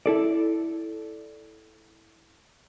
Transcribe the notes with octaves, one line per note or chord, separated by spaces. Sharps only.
E4 A4 D5